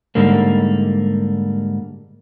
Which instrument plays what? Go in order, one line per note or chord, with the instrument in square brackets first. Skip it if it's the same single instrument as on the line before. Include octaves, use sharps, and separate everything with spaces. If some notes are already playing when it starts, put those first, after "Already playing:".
[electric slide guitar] G#2 D3 G3 A#3